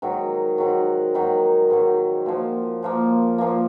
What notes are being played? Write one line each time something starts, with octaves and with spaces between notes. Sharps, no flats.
G#2 D#3 F#3
G#2 D#3 F#3
G#2 D#3 F#3
G#2 D#3 F#3
A#2 F3 A#3
A#2 F3 A#3
A#2 F3 A#3